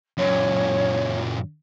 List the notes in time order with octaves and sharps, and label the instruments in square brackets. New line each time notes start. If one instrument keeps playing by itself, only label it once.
[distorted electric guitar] F#2 A#2 [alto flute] C#5